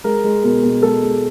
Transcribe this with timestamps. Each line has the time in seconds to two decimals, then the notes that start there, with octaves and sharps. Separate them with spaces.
0.04 G#3 A#4
0.24 G#3
0.44 B2 A#4
0.63 B2
0.82 G#3 A4
1.03 G#3